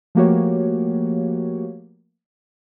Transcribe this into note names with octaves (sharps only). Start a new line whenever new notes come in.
F3 A3 A#3 F#4 G4 C#5